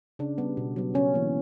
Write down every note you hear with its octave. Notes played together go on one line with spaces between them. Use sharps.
C#3 D4
G3 B3
B2
F#3 B3
C#3 C#4
E3 A#3